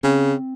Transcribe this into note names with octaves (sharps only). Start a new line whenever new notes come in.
C#3 C4